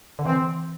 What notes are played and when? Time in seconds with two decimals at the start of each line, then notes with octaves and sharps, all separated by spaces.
0.19 D3
0.26 E3 C4